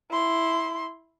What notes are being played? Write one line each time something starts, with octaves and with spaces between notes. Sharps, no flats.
E4 C6